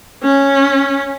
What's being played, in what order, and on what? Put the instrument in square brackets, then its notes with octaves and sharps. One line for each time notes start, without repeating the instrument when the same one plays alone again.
[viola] C#4